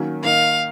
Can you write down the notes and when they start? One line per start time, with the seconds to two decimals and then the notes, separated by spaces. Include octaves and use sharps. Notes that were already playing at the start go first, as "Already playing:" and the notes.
Already playing: D#3 F#3 A#3 C#4
0.24 D#3 A#3 D#4 F5